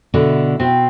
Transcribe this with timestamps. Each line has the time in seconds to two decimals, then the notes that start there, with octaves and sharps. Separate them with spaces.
0.14 B2 D3 E4
0.60 B2 C4